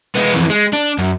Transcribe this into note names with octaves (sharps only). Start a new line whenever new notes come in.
G#3 B3
F2 E3
G#3
D4
F#2